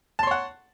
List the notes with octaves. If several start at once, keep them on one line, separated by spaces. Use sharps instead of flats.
C#5 F#5 A5 C6